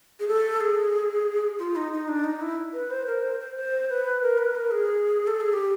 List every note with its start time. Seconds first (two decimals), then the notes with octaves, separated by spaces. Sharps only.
0.20 G#4
0.28 A4
0.61 G#4
1.59 F4
1.76 D#4
1.92 D#4
2.08 D4
2.24 D#4
2.41 E4
2.74 B4
2.91 C5
3.07 A#4
3.23 C5
3.40 C5
3.56 C5
3.89 B4
4.23 A#4
4.38 B4
4.55 A#4
4.71 G#4
5.27 A4
5.40 G#4
5.53 G4